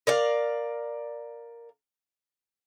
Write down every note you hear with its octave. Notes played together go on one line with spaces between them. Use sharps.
A#4 D5 F5